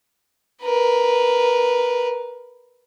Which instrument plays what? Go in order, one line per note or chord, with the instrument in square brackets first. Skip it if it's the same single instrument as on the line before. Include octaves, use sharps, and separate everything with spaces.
[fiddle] A#4 B4